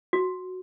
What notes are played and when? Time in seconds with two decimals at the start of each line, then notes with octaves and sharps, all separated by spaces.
0.13 F#4